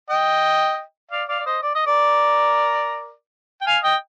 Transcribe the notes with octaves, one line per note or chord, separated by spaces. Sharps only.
D#5 G5
D5 F5
D5 F5
D5
C5 D#5
D5
D#5
A#4 D5
G5
F5 G#5
D#5 G5